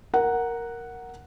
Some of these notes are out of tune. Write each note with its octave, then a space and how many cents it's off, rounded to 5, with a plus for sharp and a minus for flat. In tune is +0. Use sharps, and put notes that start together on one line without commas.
A#4 +0 F#5 +0